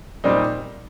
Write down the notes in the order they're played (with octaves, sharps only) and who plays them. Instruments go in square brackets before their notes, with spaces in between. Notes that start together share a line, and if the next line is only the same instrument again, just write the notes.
[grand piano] A#2 G3 C4 D#4 [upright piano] D5